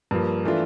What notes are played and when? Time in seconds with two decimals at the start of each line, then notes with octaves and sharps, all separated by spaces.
0.11 G2 F3 A#3
0.45 E3 A3 D4 F4